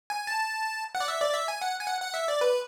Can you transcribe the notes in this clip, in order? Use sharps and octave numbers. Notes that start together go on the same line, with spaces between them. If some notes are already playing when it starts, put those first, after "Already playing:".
G#5
A5
F#5
D5
E5
D5
E5
G#5
F#5
G#5
F#5
F#5
E5
D5
B4